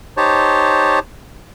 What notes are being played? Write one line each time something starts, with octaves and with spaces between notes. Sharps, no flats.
D#4 G4 C5 C#5 A5